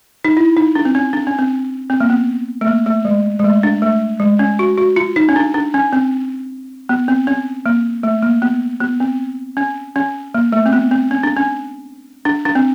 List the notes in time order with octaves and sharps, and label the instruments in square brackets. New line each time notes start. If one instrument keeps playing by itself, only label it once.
[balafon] D#4
E4
D#4
D4
C4
C#4
D4
C#4
C4
C4
A#3
B3
A3
A#3
A3
G#3
G#3
A3
D4
A3
G#3
C#4
F#4
F#4
F4
D#4
C#4
D4
D4
C#4
C4
B3
C4
C#4
A#3
A3
A#3
B3
B3
C4
C#4
C#4
A#3
A3
C4
B3
C4
C#4
D4
C#4
D4
D4
C4